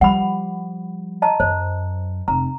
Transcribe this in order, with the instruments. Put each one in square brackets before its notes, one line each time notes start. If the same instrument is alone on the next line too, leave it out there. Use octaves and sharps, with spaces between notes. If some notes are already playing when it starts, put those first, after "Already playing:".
[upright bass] F3 G3 [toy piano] F#5 B5
[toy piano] D#5 A5 A#5
[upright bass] F#2 [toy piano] C5
[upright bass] F1 [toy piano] A#5